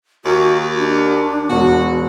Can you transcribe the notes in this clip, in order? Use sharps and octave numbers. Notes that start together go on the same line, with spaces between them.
D#2 F#4
D4
E1 B2 F#4